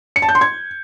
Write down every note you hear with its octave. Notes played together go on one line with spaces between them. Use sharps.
C#7
A5
G6
C6
G#6